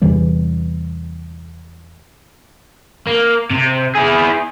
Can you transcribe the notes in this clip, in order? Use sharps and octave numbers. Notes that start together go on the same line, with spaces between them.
E2 C3 E3 G3
A#3
C3
E4 G#4